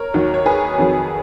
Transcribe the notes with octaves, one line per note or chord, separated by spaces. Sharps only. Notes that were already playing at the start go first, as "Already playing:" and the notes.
Already playing: A#4 C#5
D#2 D#3 F#3
C#5
G#4 B4
F2 D#3 F#3